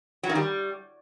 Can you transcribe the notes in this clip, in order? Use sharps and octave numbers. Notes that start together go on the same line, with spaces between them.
F#3
D#3
G3